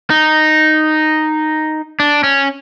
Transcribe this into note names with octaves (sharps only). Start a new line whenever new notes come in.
D#4
D4
C#4